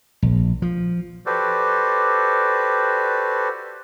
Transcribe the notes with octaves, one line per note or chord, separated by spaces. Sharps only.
A#1
F3
F#4 G4 A4 B4 C5 D5